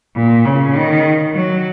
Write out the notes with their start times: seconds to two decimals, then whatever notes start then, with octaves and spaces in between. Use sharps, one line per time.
0.16 A#2
0.45 C#3
0.75 D#3
1.35 F#3